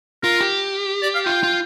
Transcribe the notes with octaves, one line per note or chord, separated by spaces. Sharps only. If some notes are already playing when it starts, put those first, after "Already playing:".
F4 A#4
G4
D5
F5
F4 G5
F4